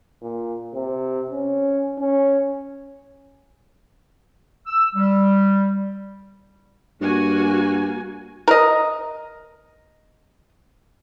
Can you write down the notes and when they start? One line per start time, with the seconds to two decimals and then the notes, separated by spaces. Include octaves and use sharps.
0.22 A#2
0.75 C3
1.31 C#4
1.99 C#4
4.67 E6
4.95 G3
7.01 G2 A#3 F#4 G#5
8.48 A#4 D#5